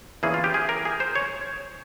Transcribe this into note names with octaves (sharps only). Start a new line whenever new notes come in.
E2 E3 A#3 C#4 G#4
F4
G4
G#4
A#4
G#4
C5
C#5